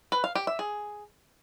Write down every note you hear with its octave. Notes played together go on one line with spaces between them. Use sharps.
B4
F5
G4
E5
G#4